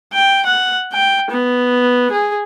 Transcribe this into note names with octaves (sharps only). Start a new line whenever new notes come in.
G5
F#5
G5
B3
G#4